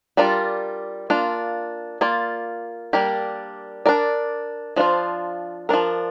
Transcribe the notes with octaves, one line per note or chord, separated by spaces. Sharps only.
G3 D4 F4 A#4 D5
A#3 D4 F4
A#3 F4 D5
G3 A#3 D4 G4 A#4
D4 A#4 D5
F3 D4 F4 C5
F3 D4 A#4